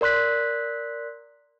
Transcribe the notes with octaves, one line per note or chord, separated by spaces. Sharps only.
A#4 D5 C6 F#6 B6